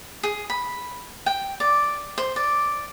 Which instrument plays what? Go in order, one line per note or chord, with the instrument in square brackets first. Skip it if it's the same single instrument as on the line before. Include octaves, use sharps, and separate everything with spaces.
[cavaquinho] G#4
B5
G5
D5
C5
D5